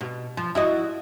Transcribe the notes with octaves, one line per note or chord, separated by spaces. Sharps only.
B2
F3
E4 F#4 D#5